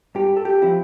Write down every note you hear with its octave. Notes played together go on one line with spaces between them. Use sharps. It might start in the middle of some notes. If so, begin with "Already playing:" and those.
G2 G4
A4
G4
F3 C4 E4